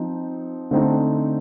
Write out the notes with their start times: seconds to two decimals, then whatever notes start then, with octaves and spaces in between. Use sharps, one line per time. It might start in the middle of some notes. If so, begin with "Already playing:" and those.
Already playing: F3 C4 D#4
0.71 D3 A3 C4 D#4